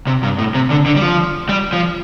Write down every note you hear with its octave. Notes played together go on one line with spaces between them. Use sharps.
C3
G2
A2
C3
D3
D3
G3
F3
G3
F3